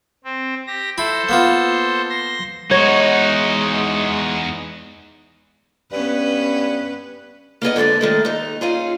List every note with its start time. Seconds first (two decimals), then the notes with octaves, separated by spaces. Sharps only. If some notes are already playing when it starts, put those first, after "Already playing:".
0.25 C4
0.67 G4 A#6
0.98 E4 A4 C5
1.29 A#3 B3 F4
2.10 C6 A#6
2.71 E2 G#3 D#4 F#4 C#5
5.92 G2 B3 C#4 B4
7.62 A#3 B3 G#4 D#5
7.76 G#2 D3 G#4 A4 D5
8.01 D#3 G#3 A3
8.25 D#2 D#4
8.61 C#4 D#4 F4 G#4